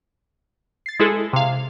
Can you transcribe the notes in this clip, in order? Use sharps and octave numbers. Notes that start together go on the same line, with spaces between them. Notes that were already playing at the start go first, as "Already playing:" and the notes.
A6 C7
G#3 E4 G#4 A4
C3 F5